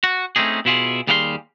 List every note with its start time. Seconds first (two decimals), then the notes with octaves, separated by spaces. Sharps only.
0.03 F#4
0.36 A3 C4 C#4 D#4 G#4
0.65 B2 E4 F4 G#4
1.07 D#2 G3 G#4 F5 F#5 C6